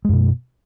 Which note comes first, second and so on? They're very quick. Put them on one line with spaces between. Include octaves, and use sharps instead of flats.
G#3 F#2 B2